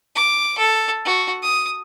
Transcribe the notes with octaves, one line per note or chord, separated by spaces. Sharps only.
D6
A4
F#4
D#6